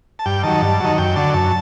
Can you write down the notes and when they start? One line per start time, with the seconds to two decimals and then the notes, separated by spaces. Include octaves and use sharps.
0.19 A5
0.26 G2 G5
0.43 D#3 F#3 A5
0.62 G2
0.80 D#3 F#3
0.98 F#2 G5
1.16 D3 F#3 A5
1.34 F#2 A5